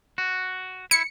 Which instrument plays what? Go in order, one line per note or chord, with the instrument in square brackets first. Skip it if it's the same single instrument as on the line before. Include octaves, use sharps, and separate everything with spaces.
[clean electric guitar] F#4
[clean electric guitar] E4 [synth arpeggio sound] C#7